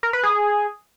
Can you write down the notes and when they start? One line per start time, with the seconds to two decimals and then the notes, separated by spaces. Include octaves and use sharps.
0.03 A#4
0.13 B4
0.23 G#4